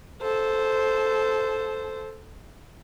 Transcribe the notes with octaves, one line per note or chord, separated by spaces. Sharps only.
A4 C5